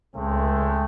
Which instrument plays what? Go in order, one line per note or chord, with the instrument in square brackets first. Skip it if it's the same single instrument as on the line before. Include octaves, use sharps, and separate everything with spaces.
[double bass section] C#2 [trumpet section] G#3 A3 C4